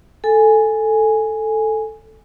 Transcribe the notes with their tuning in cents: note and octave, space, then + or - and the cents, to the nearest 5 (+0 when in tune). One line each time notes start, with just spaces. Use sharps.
A4 +0 G#5 +0